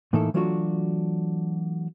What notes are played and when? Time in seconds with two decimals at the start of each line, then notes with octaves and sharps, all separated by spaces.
0.13 A2 E3 A#3 D#4 E4 A4
0.34 E3 F#3 A3 D4 F4 F#4